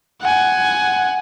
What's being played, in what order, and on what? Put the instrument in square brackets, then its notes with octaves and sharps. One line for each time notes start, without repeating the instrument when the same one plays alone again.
[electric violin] F#5 G#5